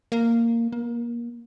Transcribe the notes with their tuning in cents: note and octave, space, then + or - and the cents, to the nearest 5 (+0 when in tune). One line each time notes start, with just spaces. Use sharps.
A#3 -10
A#3 +25